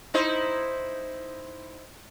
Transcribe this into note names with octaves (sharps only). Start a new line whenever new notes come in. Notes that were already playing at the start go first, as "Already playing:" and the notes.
D#4 E4 C5